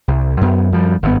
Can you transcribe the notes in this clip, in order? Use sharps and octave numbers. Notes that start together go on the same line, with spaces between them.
C2
F#2 B3
F#2 F3 G3
G#1 G2 C3 B3